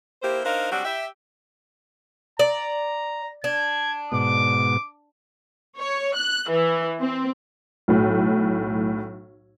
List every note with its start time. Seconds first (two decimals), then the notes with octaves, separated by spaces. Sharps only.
0.22 A#3 E4 G4 C5
0.45 D4 D#4 A#4 C5 F5
0.71 G3 C4 D4 F#4
0.85 G4 E5
2.39 D5 A#5
3.44 D4 G#6
4.12 G#2 B2 D6
5.78 C#5
6.16 F#6
6.51 E3
7.00 C4
7.88 B1 A2